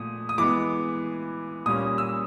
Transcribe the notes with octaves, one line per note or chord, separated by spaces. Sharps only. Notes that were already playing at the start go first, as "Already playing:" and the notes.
Already playing: A#2 F3 A3 D#6
D#6
E3 G#3 B3 D6
A#2 G3 A#3 C#4 D#6
E6